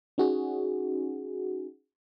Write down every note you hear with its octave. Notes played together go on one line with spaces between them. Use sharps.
C#4 D#4 F#4 G#4